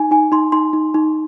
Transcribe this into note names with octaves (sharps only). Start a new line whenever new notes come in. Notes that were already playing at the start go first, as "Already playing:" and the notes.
Already playing: D#4 G#5
D#4 G#5
D#4 C6
D#4 C6
D#4
D#4